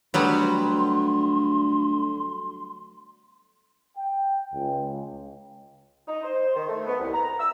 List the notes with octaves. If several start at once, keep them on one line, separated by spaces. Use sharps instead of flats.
D2 F#3 G3 B3 C6
G5
C#2
D#4
C5
D#3
A3
B3
C2
A#5
E6